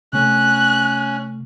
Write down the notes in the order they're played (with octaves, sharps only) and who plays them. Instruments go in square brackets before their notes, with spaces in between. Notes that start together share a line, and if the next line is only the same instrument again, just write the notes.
[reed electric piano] C3 A3 [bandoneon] C#4 [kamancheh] F#6